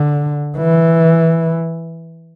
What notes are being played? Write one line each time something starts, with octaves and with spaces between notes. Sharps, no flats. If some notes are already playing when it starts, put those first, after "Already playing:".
Already playing: D3
E3